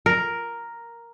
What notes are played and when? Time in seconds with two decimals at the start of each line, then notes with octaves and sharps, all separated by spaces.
0.06 A#4